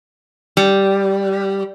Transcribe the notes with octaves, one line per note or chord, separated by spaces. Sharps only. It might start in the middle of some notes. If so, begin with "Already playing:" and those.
G3